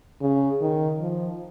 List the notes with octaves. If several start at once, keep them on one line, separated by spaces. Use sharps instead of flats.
C#3
D#3
F3